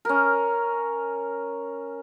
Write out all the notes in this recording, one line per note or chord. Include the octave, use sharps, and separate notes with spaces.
C#4 A#4